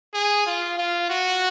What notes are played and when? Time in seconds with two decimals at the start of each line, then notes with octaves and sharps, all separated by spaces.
0.14 G#4
0.46 F4
0.78 F4
1.10 F#4